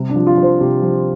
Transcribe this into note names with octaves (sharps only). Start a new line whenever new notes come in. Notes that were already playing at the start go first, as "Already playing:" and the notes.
Already playing: C3 G3
D4
F3
F4
F3
C5
C3 G4
F3